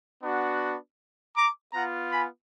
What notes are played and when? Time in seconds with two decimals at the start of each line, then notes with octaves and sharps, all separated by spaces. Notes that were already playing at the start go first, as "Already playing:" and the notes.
0.23 B3 D4 F#4
1.36 A#5 D6
1.73 B3 F4 F#5 A#5
2.11 G#5 B5